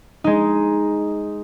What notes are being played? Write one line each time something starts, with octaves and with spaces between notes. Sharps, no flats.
G#3 D#4